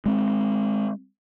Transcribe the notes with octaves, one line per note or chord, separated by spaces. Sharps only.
G#3 C4